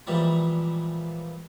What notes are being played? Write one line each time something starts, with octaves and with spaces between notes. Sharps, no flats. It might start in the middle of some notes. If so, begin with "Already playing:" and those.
A#2 E3 F3 G3 G#3